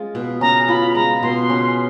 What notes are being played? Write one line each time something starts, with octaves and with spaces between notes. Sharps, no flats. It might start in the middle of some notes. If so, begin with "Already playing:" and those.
Already playing: G#3 C#4 F4
B2
C#4 A#5
F4 B5
B5
G#3 A#5
B2 C6
C#4